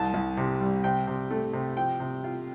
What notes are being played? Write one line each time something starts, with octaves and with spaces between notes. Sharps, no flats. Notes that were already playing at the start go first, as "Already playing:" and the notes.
Already playing: C2 A5
C2
C3
G3
C3 G5
C3
A3
C3
F3 G5
C3
F4